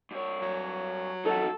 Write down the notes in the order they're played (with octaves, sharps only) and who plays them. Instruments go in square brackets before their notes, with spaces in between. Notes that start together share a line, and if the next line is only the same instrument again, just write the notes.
[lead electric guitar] G2 C#5
[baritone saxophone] F#3
[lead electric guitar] D#4 F#4 [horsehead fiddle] A4